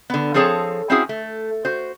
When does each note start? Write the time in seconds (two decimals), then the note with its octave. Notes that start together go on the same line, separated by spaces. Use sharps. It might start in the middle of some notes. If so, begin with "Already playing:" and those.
0.10 D3 B3
0.34 F3 C4 G#4 A4 C#5 A5
0.90 C4 C#4 E4 F#4 G#4
1.09 A3
1.65 F#4 C5